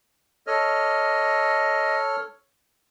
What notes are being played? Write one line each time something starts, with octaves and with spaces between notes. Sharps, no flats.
A4 C#5 D#5 F6